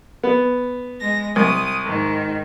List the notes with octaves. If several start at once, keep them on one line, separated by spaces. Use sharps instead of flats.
B3
G#3 A#6
C2 D#6
G#2 D#3